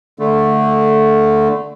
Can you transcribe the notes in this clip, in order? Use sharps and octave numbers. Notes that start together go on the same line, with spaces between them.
D3 A3